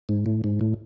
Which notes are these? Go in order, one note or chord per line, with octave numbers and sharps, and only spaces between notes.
G#2
A2
G#2
A2